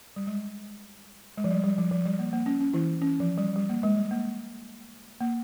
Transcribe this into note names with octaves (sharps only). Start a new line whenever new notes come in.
G3
G#3
G#3
F3
G3
G3
F3
F3
G3
A#3
A#3
C#4
C#4
E3 E4
C#4
F3
G3
G3
A#3
G#3
G3
A#3
A#3